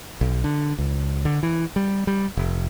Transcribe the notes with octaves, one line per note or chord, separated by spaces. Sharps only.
B1
D3
C#2
D3
E3
G3
G3
F1